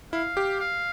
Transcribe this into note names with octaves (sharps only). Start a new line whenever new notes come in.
E4 F5
G4
F5